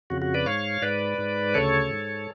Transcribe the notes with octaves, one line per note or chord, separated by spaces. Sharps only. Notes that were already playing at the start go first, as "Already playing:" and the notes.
F2 C#3 F#4
F#4
B4 D5
G#2 C#5 F5
G#2 B4 D5
G#2
D2 C#3 A4 C#5
G#2